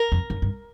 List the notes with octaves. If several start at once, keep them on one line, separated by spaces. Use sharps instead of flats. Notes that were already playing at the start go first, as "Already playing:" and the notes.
Already playing: A#4
F2
F#2
G2